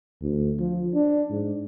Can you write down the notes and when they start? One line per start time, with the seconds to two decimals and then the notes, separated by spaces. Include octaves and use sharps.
0.21 D2
0.59 F3
0.94 D4
1.30 G#2